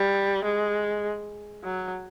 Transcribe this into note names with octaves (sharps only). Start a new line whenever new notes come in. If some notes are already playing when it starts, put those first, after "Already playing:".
Already playing: G3
G#3
F#3